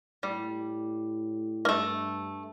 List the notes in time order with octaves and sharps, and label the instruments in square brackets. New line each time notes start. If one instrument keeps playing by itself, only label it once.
[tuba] A2 [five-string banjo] G3
[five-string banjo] A#3
[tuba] G2 [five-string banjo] A3